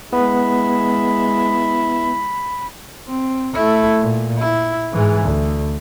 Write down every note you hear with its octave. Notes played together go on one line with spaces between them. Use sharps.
G#3 B3 E4 B5
C4
A3 E4
A#2
E4
G#2 E3
D2